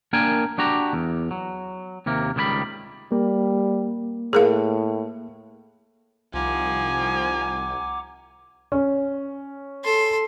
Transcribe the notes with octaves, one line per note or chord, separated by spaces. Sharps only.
A#3 D4 A#4 G5 G#5
D4 F#4 G4 A#5
E2
F#3
D#2 C3 A#3
C#2 D#3 G3 G#5 B5
G3 A#3
A2 G#4 A#4 F5
C2 D#3 F3 F#5 G#5 A#5 D6
C#4
A4 C6